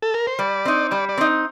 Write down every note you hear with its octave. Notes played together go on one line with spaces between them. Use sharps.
A4
A#4
C5
G3 D5
C4 D#4
G3 D5
D5
C4 D#4